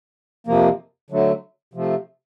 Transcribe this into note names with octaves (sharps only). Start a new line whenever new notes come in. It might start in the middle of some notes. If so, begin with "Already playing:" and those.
F2 C3 F3 A#3
D3 F#3 A3
C3 F3 A3